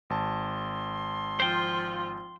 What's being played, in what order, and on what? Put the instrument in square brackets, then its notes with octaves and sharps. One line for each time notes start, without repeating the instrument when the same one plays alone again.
[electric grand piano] G#1 A5 [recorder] C6
[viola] F3 F4 [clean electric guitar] C5 G5